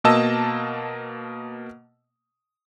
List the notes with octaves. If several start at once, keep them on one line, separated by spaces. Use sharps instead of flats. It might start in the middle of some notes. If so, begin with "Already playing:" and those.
B2 A#3 D#5 A5 E6